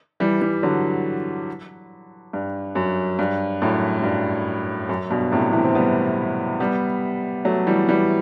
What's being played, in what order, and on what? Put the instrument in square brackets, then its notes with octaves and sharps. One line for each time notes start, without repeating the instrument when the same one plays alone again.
[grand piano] E3 G3
E3 G3
D3 F#3
G2
F#2
G2
F#2 A2
F#2
G2
F#2
G2 B2
A2 C3
C3 E3
C4
G3 B3
G3 B3
F#3 A3
E3 G3
E3 G3